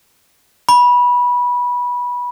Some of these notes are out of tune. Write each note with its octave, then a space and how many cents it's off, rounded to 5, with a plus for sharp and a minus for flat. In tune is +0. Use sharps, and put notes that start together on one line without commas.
B5 -20